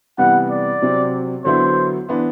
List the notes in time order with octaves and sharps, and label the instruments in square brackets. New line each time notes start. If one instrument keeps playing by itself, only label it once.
[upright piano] C3 E3 G3 B3 [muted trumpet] F#5
[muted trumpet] D5
[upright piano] C3 F#3 C4
[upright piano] D3 F#3 B3 E4 [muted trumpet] C5
[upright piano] E3 B3 D4